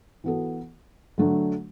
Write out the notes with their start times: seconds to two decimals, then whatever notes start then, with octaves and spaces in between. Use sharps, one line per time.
0.24 E3 B3 F#4 A4
1.18 D3 F#3 A3 D4